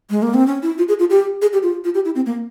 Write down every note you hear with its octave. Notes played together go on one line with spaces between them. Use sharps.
G#3
A#3
C4
C#4
E4
F4
G#4
F4
G4
G#4
G4
F4
F4
G4
E4
C4
A#3